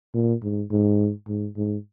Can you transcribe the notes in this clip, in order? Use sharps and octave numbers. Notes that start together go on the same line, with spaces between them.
A#2
G#2
G#2
G#2
G#2